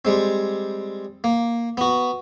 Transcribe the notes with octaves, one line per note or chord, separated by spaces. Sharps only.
G3 G#3 C4
A#3
B3 F#4